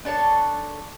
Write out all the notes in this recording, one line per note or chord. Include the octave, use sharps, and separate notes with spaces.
D4 A4 C#5 A5